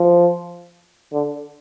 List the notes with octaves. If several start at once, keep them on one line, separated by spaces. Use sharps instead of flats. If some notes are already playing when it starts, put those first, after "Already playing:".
Already playing: F3
D3